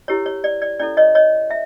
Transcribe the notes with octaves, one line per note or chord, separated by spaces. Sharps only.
E4 G4 A#4 C#5
C#5
D5
D5
C#4 E4 A4 D5
C#5 D#5
C#5 D#5
E5